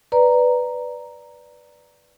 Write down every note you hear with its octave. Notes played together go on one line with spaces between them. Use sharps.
B4 D5 A#5